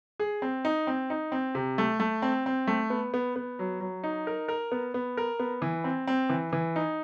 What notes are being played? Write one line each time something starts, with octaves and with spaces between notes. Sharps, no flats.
G#4
C4
D#4
C4
D#4
C4
C3
A3
A3
C4
C4
A3
B3
B3
B3
F#3
F#3
D#4
A#4
A#4
B3
B3
A#4
B3
E3
C4
C4
E3
E3
D#4